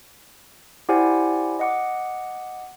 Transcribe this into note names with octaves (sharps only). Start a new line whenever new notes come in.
E4 G4 C5 D5 F#5 G#5
D#5 F#5 D6